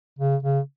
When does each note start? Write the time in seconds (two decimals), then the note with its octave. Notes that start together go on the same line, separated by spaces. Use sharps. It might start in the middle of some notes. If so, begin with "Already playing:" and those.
0.19 C#3
0.43 C#3